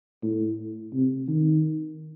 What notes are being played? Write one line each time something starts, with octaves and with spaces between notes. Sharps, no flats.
A2
C3
D#3